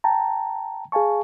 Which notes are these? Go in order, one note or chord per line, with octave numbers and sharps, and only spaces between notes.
G5 A5 A#5
G#4 F5 G#5 A5 C#6